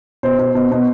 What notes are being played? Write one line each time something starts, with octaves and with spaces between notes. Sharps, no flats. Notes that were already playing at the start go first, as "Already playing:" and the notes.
B2 C5
B2
B2
B2